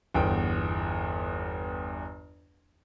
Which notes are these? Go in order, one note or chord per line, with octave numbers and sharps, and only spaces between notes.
G1 E2 G5